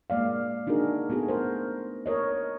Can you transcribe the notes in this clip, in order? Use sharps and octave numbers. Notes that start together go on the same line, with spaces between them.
G#3 A#3 D5 F5
D4 D#4 F#4 G#4 A#4
A3 B3 F#4 G#4
A#4 C5
A#4 C#5 D#5